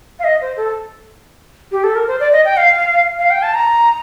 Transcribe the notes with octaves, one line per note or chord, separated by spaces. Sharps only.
F5
D#5
C5
A4
G4
A4
A#4
C5
D5
D#5
G5
F5
F5
G5
A5
A#5